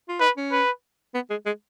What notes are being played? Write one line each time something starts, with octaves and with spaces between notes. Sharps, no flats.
F4
D#4 B4
C#4
B4
B3
G#3
G#3